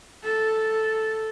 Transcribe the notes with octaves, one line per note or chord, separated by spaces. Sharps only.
A4